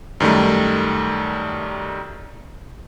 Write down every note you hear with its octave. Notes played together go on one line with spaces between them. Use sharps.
F#2 D#3 G3 A3